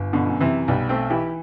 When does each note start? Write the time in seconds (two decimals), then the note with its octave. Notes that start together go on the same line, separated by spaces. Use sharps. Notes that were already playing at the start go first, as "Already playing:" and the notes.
Already playing: G1
0.13 B2 D3
0.27 F#2
0.41 C3 E3
0.68 B1 G3 B3
0.89 A3 C4
1.10 E3 E4 G4